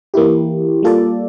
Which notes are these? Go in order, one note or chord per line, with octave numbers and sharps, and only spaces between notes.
E3 A#3 E4 G4
G3 A#3 F4 A4 D5